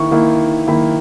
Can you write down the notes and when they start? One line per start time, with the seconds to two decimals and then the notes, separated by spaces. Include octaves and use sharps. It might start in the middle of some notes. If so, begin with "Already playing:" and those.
Already playing: D#3 A#3 E4 C#6
0.11 D#3 A#3 E4
0.68 D#3 A#3 E4 B5